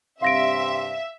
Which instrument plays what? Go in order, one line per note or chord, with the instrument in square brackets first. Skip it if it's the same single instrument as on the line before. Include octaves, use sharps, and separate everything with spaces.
[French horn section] G2 C3 [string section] E5 [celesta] F5 A#6 D7 [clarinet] C6